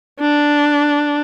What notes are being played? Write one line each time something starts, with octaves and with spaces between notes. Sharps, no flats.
D4